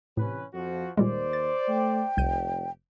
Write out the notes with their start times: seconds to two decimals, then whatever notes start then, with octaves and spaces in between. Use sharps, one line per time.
0.17 A2 C3 E3 C#4 B4
0.54 F2 F3 F#4
0.97 D#2 A#2 G3 G#3 C5 D5
1.33 A6
1.69 A3 G5
2.17 F1 C2 G6 D#7